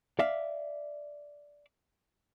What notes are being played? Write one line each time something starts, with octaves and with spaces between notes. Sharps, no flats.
D5 E5 F5